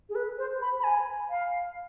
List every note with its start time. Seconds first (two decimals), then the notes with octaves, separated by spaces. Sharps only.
0.09 G#4
0.15 B4
0.38 C5
0.61 B5
0.80 B5
0.84 G#5
1.30 F5